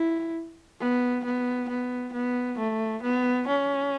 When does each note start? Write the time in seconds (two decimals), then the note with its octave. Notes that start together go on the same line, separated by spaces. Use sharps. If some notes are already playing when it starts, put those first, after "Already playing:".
Already playing: E4
0.80 B3
1.24 B3
1.69 B3
2.13 B3
2.58 A3
3.03 B3
3.48 C#4